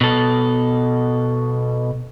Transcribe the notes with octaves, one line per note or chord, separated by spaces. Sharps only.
B2 A4